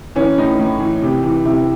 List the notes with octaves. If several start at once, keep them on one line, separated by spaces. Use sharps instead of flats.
E3 C#4
A2 D#4
A2
E3
C3
E3
C3 E4